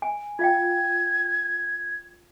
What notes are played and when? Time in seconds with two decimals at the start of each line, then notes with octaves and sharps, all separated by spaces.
0.02 G#5
0.39 F4 F5 G5 G#6